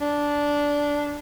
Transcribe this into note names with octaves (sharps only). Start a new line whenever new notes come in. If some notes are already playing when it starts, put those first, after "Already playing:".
D4